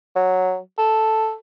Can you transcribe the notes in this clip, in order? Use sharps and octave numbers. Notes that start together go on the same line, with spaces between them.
F#3
A4